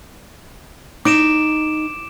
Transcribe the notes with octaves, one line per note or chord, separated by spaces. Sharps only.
D#4 D6 D7 E7